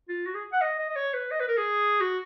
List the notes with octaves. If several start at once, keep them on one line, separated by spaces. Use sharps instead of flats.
F4
F#4
G#4
F#5
D#5
D#5
D#5
C#5
B4
D#5
B4
A#4
G#4
F#4